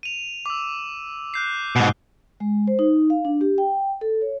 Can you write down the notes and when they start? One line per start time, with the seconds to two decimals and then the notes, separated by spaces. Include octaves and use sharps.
0.03 D#7 F7
0.46 D6 E6
1.34 F#6 G6 C7
1.76 G#2 B2 D#6 F#6 G7
2.40 G#3
2.67 C5
2.79 D#4
3.10 F5
3.25 D4
3.41 G4
3.58 G5
4.01 A4
4.21 C#5